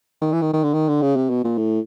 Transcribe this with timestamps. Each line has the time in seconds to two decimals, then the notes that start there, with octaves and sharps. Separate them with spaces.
0.21 D#3
0.32 E3
0.42 D#3
0.53 D#3
0.63 D3
0.73 D#3
0.88 D3
1.02 C#3
1.16 C3
1.29 B2
1.44 A#2
1.57 A2